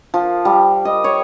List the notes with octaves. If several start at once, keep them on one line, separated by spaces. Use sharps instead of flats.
F3
G3
D#5
C#5